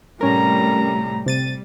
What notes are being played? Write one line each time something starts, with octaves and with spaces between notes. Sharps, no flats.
A2 C3 G3 A3 C#4 A#4 A#5
C3 G3 A6 D#7